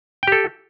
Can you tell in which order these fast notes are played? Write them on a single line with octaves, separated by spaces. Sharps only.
G5 G4 A4